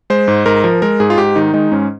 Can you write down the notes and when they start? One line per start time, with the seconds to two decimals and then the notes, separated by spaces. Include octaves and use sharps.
0.10 G#3 C5
0.28 G#2
0.46 G#2 A#4
0.64 F3 A#4
0.82 G#3 A#4
1.00 G#2 G#4
1.10 F4
1.18 G#2 G4
1.36 D#3 D#4
1.54 G#3 D#4
1.72 G#2 C#4